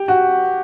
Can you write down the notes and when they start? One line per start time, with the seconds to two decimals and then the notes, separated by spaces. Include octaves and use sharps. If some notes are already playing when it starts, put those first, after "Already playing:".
Already playing: G4
0.08 F#4